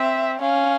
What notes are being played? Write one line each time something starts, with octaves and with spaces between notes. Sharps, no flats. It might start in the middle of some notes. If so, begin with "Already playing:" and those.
Already playing: C4 E5
C#4 F5